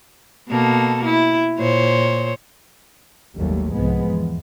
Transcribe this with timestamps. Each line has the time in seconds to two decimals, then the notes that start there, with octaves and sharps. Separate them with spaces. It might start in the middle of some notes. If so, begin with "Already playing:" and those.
0.48 B2 A#3 A4
1.05 E4
1.58 A#2 C5 C#5
3.34 G#1 D#2 F#3 G3 A3
3.73 C2 G#2 F3 G#3 B3
4.07 E2